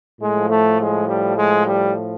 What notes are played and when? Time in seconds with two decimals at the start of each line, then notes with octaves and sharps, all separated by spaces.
0.21 A2 F3 G#3
0.50 A3
0.80 G#3
1.08 G3
1.37 G#3
1.66 G3